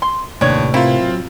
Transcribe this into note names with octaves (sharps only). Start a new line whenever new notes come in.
C6
D#2 A2 C3 D4 B4 C#5
A#3 C4 E4 F4
F#3